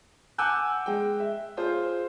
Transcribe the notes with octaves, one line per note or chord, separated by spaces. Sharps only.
F#5 G#5 D6 E6 F#6 G6
G#3 G5
E5
F4 G#4 C5